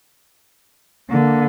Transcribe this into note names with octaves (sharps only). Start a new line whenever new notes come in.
D3 A#3